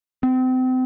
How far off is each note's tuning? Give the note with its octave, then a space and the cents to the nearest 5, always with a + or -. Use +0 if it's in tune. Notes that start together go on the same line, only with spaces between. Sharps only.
C4 -35